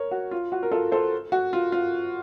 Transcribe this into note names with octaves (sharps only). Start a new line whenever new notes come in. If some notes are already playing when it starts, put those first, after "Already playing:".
Already playing: A#4 C#5
F#4
F4
F#4
A#4
F4 A4
A4 C5
F#4
F4
F4